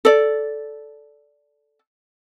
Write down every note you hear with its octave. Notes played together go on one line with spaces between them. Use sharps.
A4 D5